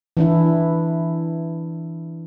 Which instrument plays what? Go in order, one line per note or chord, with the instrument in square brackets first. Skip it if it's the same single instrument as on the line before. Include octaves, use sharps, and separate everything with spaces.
[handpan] E3 D4 E4